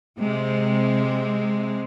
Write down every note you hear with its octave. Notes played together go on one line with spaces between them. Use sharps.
C3 G#3